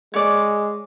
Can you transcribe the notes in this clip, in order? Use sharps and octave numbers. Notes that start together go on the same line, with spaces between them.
G#3 C#5 D5 D6